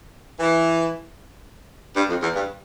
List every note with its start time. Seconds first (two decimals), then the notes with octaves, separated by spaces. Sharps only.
0.40 E3
1.96 G2
2.09 F2
2.22 E2
2.36 G2